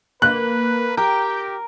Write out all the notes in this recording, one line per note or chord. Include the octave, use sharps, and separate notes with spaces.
A#3 B4 F#6
G4 A#4 G5